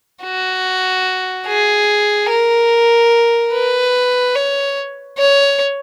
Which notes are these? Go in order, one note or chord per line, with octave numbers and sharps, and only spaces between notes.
F#4
G#4
A#4
B4
C#5
C#5